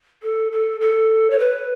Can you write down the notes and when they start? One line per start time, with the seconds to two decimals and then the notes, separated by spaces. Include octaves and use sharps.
0.23 A4
0.52 A4
0.81 A4
1.30 C#5
1.39 B4